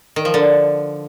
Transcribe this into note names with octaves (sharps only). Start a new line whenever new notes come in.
D#3
F3
D3